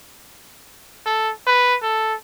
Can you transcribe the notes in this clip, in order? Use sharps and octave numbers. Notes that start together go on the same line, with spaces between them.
A4
B4
A4